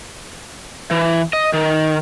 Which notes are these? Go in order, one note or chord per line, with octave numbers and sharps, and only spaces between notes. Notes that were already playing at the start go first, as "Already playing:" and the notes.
E3
D#5
D#3